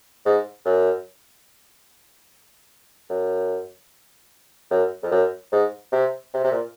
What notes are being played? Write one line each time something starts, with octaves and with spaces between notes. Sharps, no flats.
G#2
F#2
F#2
F#2
F2
F#2
G#2
C3
C3
C3
A#2